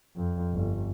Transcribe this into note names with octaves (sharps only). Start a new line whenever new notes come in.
F2
G1